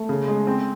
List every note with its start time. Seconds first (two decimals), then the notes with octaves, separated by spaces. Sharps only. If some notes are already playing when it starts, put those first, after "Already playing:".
Already playing: A3
0.09 C#3
0.28 G#3
0.47 C4